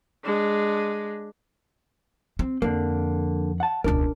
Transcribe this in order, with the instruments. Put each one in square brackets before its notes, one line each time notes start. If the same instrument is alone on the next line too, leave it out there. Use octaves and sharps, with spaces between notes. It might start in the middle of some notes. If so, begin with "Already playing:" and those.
[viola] G#3 D4
[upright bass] C4
[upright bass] F2 [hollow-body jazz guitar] D3 A#3
[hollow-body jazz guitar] F#5 A5
[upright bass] E1 C#2 [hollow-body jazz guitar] D4 A#4